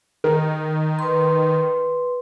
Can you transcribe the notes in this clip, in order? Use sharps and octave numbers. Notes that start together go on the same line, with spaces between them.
D#3 A#4
B4 C6